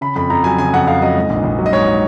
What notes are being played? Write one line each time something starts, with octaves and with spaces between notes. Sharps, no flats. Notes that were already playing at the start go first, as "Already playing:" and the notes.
C#3 B5
F2 B5
F2 A#5
F#3 G#5
C#3 G#5
F2 F#5
F2 F5
F#3 D#5
G#2
A#1
A#1
F#3
D#5
G#2 C#5